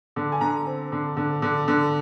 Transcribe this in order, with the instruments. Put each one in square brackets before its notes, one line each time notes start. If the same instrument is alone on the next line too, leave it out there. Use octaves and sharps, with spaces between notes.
[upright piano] D3
G#5
D3 A#5
C4
D3
D3
D3
D3